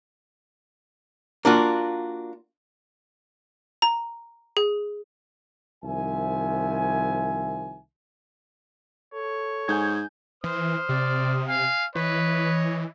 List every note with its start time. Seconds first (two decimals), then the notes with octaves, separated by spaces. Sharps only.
1.45 A#3 D4 F4 F#4
3.82 A#5
4.57 G#4
5.83 C2 D#3 F3 E5 G#5
9.14 A4 C#5
9.68 G#2 G#5 G6 G#6
10.44 E3 C5 D#6 F6
10.89 C3 D5
11.47 F5 G#5
11.95 E3 B4 C#5 D#5